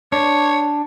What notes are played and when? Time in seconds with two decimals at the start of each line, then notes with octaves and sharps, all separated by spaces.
0.12 D4 C#5